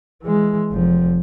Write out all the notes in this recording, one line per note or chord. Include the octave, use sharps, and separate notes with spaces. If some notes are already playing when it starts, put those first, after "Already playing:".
E3 G#3
F1 F3